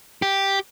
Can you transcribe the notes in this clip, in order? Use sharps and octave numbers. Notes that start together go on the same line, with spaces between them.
G4